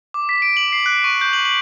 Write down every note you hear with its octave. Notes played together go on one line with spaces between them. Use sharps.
D6
B6
D7
F#7
C7
F#6
C#6
G6
F#7
F#7